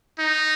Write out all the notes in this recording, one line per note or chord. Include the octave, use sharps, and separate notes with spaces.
D#4